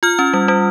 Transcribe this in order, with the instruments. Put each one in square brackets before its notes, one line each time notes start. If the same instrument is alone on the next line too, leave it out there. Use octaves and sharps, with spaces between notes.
[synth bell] F4 F6
C#4
G3
G3